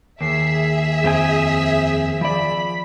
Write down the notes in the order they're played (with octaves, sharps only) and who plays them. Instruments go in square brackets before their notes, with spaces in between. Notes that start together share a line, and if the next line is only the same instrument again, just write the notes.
[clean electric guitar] D#2 [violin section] G#4 E5 [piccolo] C7
[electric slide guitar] F2 C4 G#5 [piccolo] D#6
[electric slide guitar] F3 D5 [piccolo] B5